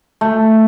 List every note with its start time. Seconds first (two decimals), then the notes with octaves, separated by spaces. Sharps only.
0.21 A3